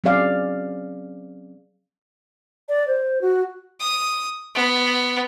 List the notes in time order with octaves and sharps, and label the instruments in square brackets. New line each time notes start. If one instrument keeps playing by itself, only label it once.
[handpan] F#3 C4 C#4 G#4 D5 F5
[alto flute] D5
C5
F#4
[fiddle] D#6
B3